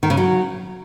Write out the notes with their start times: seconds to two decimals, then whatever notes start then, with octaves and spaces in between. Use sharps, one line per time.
0.03 D#3
0.10 C#3
0.17 F#3